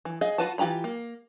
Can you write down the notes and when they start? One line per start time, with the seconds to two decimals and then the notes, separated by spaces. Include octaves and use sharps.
0.05 E3
0.21 G#4 D#5 F5
0.38 F4 F#4 B4 F#5 A5
0.58 E3 F4 G4 A#5 B5
0.84 A#3